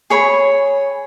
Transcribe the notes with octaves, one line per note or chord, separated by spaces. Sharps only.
G#4 C#5 B5